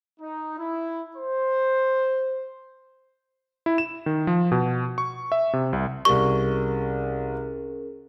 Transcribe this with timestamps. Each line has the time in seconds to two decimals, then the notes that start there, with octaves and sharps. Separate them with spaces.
0.21 D#4
0.59 E4
1.16 C5
3.66 E4
3.78 E7
4.06 D#3
4.27 F3
4.52 B2
4.98 C#6
5.32 E5
5.53 C3
5.73 C2
6.05 C2 G3 C#4 G#4 A#4 C#6